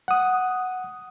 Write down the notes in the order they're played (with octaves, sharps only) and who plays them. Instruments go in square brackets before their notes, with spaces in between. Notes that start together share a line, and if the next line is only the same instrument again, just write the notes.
[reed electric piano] F#5 D#6